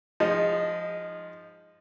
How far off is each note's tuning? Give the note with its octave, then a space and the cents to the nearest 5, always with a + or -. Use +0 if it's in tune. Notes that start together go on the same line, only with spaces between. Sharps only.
F3 +0 G#3 -30 D#4 +0